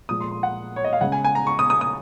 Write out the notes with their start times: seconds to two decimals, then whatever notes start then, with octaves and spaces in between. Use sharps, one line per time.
0.09 A#2 F3 G#3 D#6
0.21 C6
0.31 C6
0.43 F#5
0.76 C#5
0.84 D#5
0.93 F5
1.01 C#3 G#3 C#4 F#5
1.12 G#5
1.25 G#5
1.35 A#5
1.47 C#6
1.59 D#6
1.70 D#6
1.81 D#6